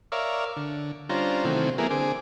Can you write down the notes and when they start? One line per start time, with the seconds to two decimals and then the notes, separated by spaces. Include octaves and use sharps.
0.12 A#4 C#5 D5 E5 F5
0.57 D3
1.09 G3 C#4 D4 F4 C5 A#5
1.45 C3 D#3 E3 F#3 A3 C4
1.78 G3 A#3 B3 E4 G#4 A#4
1.90 D3 C4 G#4 D6